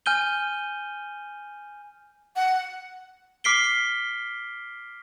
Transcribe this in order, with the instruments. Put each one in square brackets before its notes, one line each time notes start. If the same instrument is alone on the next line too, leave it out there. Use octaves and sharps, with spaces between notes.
[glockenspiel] G#5 F6 G6 D#7 G7
[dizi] F#5
[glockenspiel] D6 F6 B6 C7 D7 G7